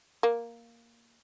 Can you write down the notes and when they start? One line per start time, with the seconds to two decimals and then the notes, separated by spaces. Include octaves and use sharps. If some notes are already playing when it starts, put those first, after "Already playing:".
0.23 A#3